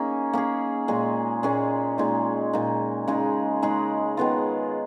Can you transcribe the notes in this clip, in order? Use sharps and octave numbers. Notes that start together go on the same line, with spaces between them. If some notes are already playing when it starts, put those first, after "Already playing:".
Already playing: A#3 C#4 D#4 G#4
A#3 C#4 G#4
A#2 G#3 C#4 G#4
A#2 G#3 C#4 G#4
A#2 G#3 D#4
A#2 G#3 D#4
C#3 G#3 D#4 G#4
C#3 G#3 D#4 G#4
D#3 G#3 B3 F4